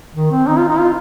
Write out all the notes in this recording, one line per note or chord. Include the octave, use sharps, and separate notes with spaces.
D#3
C4
D#4
F4
D#4
F4